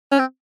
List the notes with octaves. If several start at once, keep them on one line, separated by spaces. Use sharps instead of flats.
C#4
C4